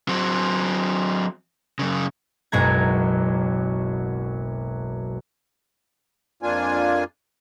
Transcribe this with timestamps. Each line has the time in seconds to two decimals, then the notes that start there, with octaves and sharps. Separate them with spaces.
0.09 F#3 C4
1.79 F#2 C#3
2.52 F#1 B1 F#2 G#3 A#5 G#6
6.43 F2 A#3 D4 F4 G#5